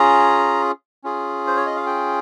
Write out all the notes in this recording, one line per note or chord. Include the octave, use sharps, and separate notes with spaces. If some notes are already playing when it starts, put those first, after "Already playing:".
Already playing: C#4 F4 G#4 A#5
C#4 F4 G#4
C5
C#5
D#5
F5
G5